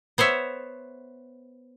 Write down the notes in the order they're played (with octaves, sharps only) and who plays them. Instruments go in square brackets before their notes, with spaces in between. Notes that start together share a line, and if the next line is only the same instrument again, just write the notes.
[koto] B3 C5 C#5 E5